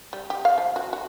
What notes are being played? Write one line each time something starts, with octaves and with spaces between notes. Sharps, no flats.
G3
G4
F5
F3
F#4
F#4